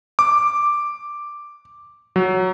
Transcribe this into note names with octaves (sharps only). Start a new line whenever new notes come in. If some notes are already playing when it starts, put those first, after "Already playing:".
D6
F#3